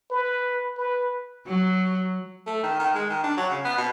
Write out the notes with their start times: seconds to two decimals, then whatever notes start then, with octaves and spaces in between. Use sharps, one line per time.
0.10 B4
0.77 B4
1.47 F#3
2.46 A3
2.63 D#3
2.79 D#3
2.95 G#3
3.10 D#3
3.24 D4
3.37 F#3
3.50 C#3
3.65 B3
3.78 B2